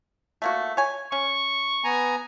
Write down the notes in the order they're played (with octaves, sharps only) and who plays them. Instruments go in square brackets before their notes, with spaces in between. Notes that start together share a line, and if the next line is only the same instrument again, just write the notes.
[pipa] A3 A#3 F#4
C#5 G#5
[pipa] C#4 [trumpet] C#6
[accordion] B3 G#5 A#5